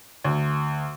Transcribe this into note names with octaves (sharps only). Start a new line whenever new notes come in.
D2